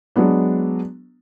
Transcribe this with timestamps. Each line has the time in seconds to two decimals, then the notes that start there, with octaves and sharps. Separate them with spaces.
0.16 F#3 G#3 B3 D4